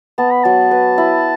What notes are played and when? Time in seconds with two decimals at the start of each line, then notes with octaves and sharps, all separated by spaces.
0.18 B3 A5
0.31 B5
0.44 F#3 A5
0.71 B4
0.98 E4